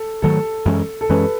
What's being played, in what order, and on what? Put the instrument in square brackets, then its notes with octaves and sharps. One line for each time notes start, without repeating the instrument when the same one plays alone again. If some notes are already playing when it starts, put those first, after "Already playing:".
Already playing: [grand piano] A4
[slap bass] G#2 D#3 F#3 A3 [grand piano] A4
[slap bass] F#2 E3 G#3 C#4
[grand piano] A4
[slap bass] F#2 E3 G#3 C#4 [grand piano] B4